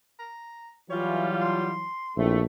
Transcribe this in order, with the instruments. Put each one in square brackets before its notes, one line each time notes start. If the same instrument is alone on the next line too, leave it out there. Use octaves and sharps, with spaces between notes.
[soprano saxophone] A#5
[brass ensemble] E3 F#3 [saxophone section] G3 F4 [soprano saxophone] C#5
[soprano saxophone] C6
[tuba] A#1 [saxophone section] A3 [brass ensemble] C4 E4